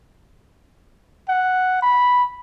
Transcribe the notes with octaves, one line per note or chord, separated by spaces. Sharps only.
F#5
B5